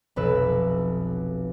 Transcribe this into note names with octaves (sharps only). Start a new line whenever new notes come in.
F1 B1 B4 E6